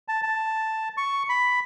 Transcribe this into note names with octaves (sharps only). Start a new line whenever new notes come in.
A5
A5
C#6
B5